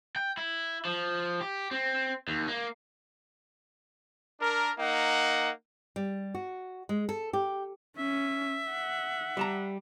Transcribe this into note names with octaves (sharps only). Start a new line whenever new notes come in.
G5
E4
F3
G4
C4
D#2
A#3
D4 A#4
A#3 D#4 F#5
G3
F#4
G#3
A4
G4
C#4 E5
F#5
G3 A5 A#5